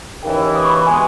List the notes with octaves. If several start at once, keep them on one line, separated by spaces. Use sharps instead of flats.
D#2 C#3 E3 G5
D#6
C#6
B5
B2 G#3 B3 G#5